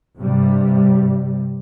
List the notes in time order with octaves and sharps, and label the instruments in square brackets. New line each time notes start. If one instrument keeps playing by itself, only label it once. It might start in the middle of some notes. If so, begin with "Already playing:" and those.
[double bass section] G2 C3 G3